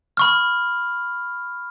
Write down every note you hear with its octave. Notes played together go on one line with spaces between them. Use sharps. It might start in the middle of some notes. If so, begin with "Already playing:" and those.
B5 C#6 F6